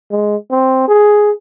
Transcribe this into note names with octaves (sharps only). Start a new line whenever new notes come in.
G#3
C4
G#4